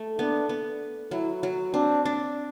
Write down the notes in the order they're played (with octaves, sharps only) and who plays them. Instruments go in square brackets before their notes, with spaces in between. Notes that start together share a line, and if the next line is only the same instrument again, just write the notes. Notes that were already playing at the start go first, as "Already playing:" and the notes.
Already playing: [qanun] A3
[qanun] B3 [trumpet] D4
[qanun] B3
[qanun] F#3 [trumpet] E4
[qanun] F#3
[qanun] C4 [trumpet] D4
[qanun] D4